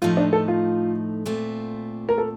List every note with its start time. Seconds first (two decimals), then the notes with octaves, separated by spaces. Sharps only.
0.02 A2 F3 A3 D#4 F4
0.17 D4
0.33 A4
0.48 F4
1.26 A#2 A3 C4 F4
2.09 A#4
2.18 A4